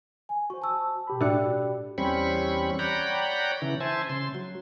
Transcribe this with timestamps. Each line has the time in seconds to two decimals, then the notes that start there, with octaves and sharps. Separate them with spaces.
0.29 G#5
0.50 F#4 C5 C#6
0.62 A5 E6
1.07 B2 G4 B5
1.21 A2 D4 F#4 D5 G5
1.98 E2 G3 C4 C#4 B5 C#6
2.79 C#5 D5 F#5 G5 A#5 B5
3.62 C#3 E3
3.80 C5 E5 G#5 A5
4.09 C#3 C6
4.35 F#3